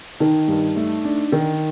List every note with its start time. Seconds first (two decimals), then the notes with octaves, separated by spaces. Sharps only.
0.20 D#3 D#4
0.48 G2
0.76 A3
1.05 D4
1.32 D#3